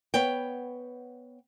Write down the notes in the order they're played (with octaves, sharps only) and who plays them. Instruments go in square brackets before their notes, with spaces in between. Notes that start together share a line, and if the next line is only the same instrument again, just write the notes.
[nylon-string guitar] B3 C#5 G5